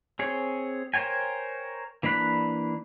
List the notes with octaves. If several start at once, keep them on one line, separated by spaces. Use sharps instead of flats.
C4 G#4 C#5
A#4 C5 C#5 G5 G#5
E3 A#3 D4 B5 F#6